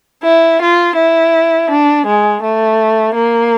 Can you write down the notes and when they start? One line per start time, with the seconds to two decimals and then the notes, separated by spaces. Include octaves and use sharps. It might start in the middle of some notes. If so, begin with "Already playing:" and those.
0.23 E4
0.61 F4
0.96 E4
1.70 D4
2.06 G#3
2.42 A3
3.15 A#3